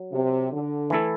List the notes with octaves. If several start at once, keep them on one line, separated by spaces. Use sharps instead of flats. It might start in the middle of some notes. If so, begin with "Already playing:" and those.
Already playing: F#3
C3
D3
E3 A3 E4 A4